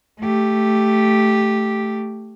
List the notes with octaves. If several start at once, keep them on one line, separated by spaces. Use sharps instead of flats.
A3 G4